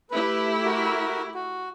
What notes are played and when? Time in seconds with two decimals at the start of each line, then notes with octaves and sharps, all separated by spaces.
0.11 A3 E4 G4 B4
0.65 F#4 A#4
1.35 F#4